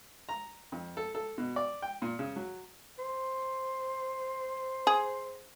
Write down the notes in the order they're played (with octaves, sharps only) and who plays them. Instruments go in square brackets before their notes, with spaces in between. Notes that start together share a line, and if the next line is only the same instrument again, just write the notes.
[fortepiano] A#5
F2
A4
A4
B2
D5
G5
A#2
C#3
F#3
[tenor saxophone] C5
[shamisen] G#4